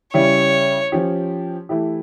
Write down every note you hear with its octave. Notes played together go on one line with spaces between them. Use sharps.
C#3 G3 C#4 E4 G4 C#5
F3 C#4 G4
E3 A3 E4 G4